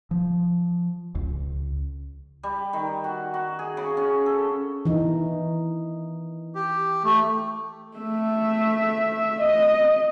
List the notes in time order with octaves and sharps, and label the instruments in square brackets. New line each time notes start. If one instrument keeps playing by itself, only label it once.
[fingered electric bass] F3
C#2
[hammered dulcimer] G3
D#3
F#4
F#4
G#4
C#3
C#4
A4
[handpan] E3 D#4
[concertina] G4
A3
[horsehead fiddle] A3 E5
D#5